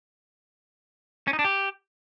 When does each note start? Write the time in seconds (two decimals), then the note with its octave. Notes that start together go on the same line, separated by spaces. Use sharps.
1.27 C#4
1.33 D#4
1.39 D4
1.44 G4